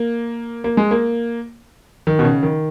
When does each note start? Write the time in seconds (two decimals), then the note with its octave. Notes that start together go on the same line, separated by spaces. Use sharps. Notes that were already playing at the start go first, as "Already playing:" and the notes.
Already playing: A#3
0.64 A#3
0.77 G#3
0.91 A#3
2.07 D#3
2.19 B2
2.24 C#3
2.43 D#3